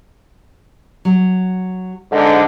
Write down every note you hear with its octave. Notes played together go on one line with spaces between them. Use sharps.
F#3
G#2 D3